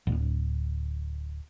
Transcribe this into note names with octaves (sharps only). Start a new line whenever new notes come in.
D1